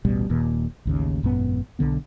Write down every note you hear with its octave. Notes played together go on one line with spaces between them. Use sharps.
A1 D2 B2 G3
D#1 D#2 A#2
A1 D#2 C#3
G#1 F#2 A#2 B3
B1 G2 D3 B3